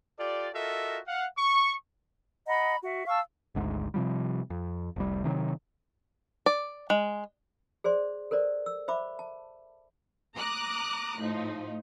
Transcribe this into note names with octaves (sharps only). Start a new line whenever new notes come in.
F4 G4 A4 D5
F4 F#4 A4 A#4 D#5 E5
F5 F#5
C#6
D#5 F#5 A#5 B5
F#4 E5
F5 A5 C#6 E6
G#1 D2 G#2
C3 F3 G3
F2
F1 C2 G3
C3 D#3 F3 F#3
D5
G#3
G#4 C5 D5 C6
A4 A#4 C5 D5
E6
C5 E5 B5 D6
A5
A#5 D6 D#6 F#6
A2 F3 D#4